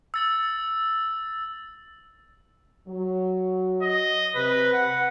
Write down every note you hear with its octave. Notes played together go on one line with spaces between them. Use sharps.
E6 A6 F#7
F#3
D#5
C3 B4
F#5